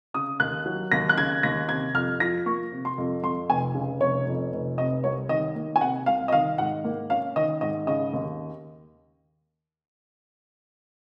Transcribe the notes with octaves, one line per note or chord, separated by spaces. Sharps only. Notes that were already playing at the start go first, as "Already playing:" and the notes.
C#3 D#6
D#2 F#6
F#3
D#2 A#6
F#6
C#3 G#6
D#2 A#6
C3 G#6
F2 F6
F3 A#6
A#3 C#6
C3
C6
F2
F2 C6
F1 G#5
C#3
F1 C#5
F2
F1
C3 D#5
C2 C#5
D#3 D#5
A#3
G#5
C3 F#5
C2 F5
D#5
D#3 F5
G#2 F#5
A#3
C#4 F5
D#3 D#5
G#2 D#5
C#3 D#5
D#2